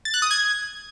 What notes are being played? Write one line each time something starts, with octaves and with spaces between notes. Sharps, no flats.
A6
F#6
D#6
G#6